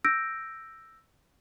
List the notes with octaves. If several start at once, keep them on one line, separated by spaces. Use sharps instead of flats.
E6 G6 A#6 D7